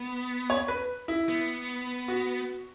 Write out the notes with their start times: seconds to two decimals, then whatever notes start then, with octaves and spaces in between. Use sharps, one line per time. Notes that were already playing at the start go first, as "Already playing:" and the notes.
Already playing: B3
0.50 C#5
0.68 B4
1.08 E4
1.29 B3
2.08 F#4